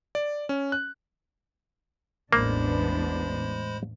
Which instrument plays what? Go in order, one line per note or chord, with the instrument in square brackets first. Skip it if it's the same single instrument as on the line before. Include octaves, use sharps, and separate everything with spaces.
[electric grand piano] D5
C#4
F#6
[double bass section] A1 [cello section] E2 B3 D4 [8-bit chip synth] G#3 C5 B5 [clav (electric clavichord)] A#3